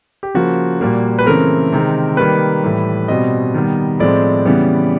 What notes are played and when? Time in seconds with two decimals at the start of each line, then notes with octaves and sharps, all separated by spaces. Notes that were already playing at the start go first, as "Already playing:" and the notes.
0.23 G4
0.34 C#3 F3 A#3 F#4
0.81 A#2 G3 A#3
1.19 B4
1.26 C#3 E3 A3 C4 A#4
1.72 C3 D#3 G#3 C4
2.17 D#3 G3 A#3 B4
2.64 A2 E3 G3
3.08 B2 G3 C4 D#5
3.54 D#3 G3 B3
3.99 A2 F3 G#3 C4 D5
4.45 C#3 E3 G3 B3